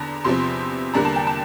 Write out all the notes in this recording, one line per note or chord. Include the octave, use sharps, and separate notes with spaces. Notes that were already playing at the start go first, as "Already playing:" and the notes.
Already playing: E2 D3 D4 A5 A#5
E2 C3 F3 C4 C6
E2 D3 G3 A#3 D4 A#5
A5
G5
A5